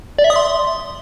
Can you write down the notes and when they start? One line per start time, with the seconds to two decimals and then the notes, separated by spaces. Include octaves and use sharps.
0.18 D5
0.24 E5
0.30 D#6
0.36 C6